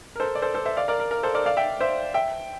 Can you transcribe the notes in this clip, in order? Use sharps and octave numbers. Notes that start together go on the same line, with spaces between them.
A#4
A4 C5
D5
A4 C5
A4 C5
C5 E5
D5 F5
A#4 D5
A#4
A#4
A4 C5
A#4 D5
D5 F5
E5 G5
C5 E5
E5 G5